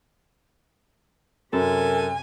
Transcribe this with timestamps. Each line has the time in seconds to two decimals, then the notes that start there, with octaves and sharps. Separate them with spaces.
1.53 F#2 C3 A4 A#4 G#5